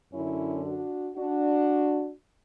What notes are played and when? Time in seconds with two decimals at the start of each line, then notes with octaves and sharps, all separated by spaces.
0.13 F#2 D3 C#4 E4
0.65 D4 F#4
1.17 D4 F#4